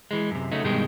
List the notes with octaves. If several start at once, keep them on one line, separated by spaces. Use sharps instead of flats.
E3 G#3
F#2 C3
C#3 F#3 A3 D#4
G2 B2 D#3 G3 G#3